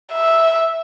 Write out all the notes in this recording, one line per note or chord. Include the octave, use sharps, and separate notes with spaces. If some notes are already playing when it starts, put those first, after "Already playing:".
E5